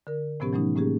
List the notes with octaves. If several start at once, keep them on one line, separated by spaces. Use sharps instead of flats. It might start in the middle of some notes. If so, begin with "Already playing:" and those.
D3 A#4
A2 C3 F3 B3 C#4 G4
E3 F#3 A3 C#4 D#4
A2 A#3 C#4 G4 G#4